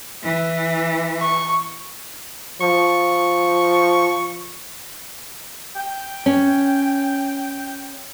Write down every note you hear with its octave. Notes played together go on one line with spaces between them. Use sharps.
E3
C#6
F3 C#6
G5
C#4